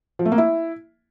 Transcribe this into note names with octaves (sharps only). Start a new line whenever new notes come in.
F3
A3
A#3
E4